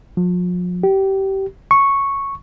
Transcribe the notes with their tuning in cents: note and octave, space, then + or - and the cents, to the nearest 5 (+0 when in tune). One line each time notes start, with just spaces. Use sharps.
F3 +40
G4 -20
C#6 -5